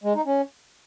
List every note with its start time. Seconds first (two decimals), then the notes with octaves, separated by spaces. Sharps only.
0.04 G#3
0.15 D#4
0.26 C#4